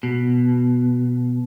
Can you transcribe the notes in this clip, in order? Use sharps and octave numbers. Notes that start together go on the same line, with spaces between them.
B2